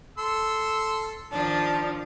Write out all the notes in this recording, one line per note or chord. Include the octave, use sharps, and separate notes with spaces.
A4 C6 E6
D#3 F3 D4 A5